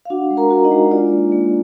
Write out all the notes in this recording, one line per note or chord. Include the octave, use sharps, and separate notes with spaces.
F5
D4 F#4 F#5
G#3
A#4 A#5
F#4
D#4 D#5
G#3
D4 F4 D5
A#3
A#3